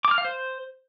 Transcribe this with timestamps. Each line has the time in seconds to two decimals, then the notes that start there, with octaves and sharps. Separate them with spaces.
0.05 D6
0.11 F6
0.18 F5
0.25 C5